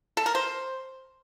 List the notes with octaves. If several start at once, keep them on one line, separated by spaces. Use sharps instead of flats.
A4
A#4
C5